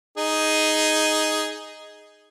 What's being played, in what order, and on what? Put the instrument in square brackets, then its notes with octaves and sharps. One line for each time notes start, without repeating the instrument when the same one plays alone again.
[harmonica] D#4 G#4